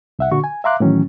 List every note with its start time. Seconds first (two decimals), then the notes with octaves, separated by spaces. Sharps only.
0.19 C2 E5 F#5
0.32 A#2 D3 F#4 C#6
0.44 G#5
0.64 E5 F5 A#5 C6 D6 F#6
0.80 A2 D#3 E3 F#3 C#4